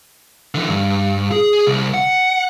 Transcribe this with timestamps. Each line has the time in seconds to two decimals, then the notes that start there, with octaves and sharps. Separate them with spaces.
0.55 D3 E3
0.68 G2
1.32 G#4
1.67 C2
1.94 F#5